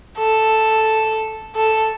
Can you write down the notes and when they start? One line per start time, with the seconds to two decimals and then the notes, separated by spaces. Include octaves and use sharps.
0.19 A4
1.56 A4